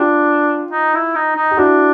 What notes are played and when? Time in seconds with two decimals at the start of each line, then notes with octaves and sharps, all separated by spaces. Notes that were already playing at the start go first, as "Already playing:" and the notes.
Already playing: D4 F4 G4
0.72 D#4
0.95 E4
1.16 D#4
1.36 D#4
1.51 G4
1.57 D4 E4 F#4